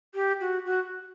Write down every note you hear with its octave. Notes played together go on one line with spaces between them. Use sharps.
G4
F#4
F#4